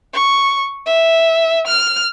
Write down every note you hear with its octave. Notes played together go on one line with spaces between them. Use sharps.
C#6
E5
F6